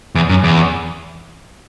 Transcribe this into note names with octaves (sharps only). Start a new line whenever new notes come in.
E2
F#2
E2